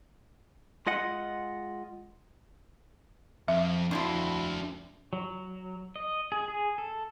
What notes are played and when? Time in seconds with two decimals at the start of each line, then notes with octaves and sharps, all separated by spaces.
0.87 G#3 F4 D#5 F#5
3.48 F2 E5
3.91 F2 A#2 D4 E4 F#4
5.13 F#3
5.96 D#5
6.32 G#4
6.48 G#4
6.78 A4